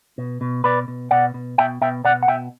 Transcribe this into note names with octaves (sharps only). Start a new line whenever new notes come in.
B2
B2
B2 B4 D5
B2
B2 D5 F#5
B2
B2 E5 G5
B2 E5 G5
B2 D5 F#5
F#5
B2 E5 G5